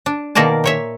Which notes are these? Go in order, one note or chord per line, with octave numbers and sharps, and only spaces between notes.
D4
B2 D#3 A#3 A#4 D5 A5
A#2 C#5 E5